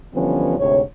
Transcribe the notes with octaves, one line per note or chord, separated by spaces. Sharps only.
D3 E3 F3 G3 B3 C#4
D2 G#2 C3 C#5